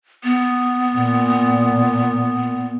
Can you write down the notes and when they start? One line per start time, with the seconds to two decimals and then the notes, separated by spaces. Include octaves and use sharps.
0.24 B3
0.96 A#2